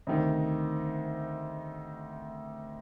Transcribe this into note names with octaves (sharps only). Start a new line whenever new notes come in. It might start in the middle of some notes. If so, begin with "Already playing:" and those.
D2 C3 D#3